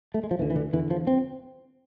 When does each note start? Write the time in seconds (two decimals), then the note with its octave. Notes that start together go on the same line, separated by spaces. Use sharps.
0.14 A3
0.23 G#3
0.31 F3
0.39 D2 D3 E3
0.50 E3
0.56 D3
0.73 E2 D3 E3
0.90 F3
1.07 C4